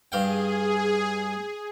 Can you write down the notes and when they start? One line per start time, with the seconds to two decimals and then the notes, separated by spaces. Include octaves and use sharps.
0.12 G2 G#4 F5 G5